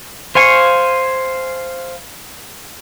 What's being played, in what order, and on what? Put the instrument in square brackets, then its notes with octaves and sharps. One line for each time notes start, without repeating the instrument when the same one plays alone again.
[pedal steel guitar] C5 F5 G#5 C#6